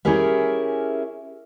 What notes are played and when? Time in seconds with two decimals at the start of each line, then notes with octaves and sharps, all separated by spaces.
0.05 C#4 E4 G4 G#4 A#4 E5